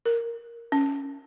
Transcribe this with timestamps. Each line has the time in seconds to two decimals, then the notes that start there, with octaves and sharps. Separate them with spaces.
0.06 A#4
0.72 C#4